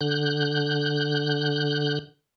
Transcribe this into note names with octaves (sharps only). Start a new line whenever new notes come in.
D3 F#6 G6